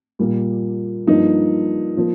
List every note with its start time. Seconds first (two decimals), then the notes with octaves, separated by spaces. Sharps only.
0.19 A#2 G3 A#3
1.07 G2 F3 A#3 D#4
1.97 F3 A#3